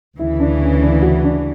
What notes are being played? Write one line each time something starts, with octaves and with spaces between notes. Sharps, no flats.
D2 C#3 E3 E4
D4
C#4
D4
F#4
D4